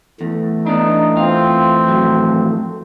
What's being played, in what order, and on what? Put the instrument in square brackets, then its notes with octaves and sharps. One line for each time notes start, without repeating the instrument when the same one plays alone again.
[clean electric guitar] E2 [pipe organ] E3 A3
[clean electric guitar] B3 D4 [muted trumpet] D#4
[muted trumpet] C4 [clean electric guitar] F4
[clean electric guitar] F2 A2 F#3